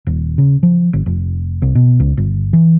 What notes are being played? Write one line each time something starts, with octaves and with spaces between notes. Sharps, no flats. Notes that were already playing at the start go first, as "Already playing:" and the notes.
D#1
C#3
F3
G1
F1
C2
B2
C#2
G1
E3